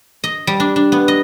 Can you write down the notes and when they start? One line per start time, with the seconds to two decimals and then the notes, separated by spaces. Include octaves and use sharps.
0.24 D#5
0.47 G3
0.60 D4
0.76 D4
0.92 B3
1.08 D#5